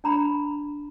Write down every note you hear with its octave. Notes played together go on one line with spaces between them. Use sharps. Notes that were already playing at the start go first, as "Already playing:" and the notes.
D4 A#5 B5